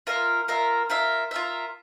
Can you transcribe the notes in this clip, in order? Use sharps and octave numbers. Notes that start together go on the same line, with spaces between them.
F4 A#4 E5
F4 A#4 E5
F4 A#4 E5
F4 A#4 E5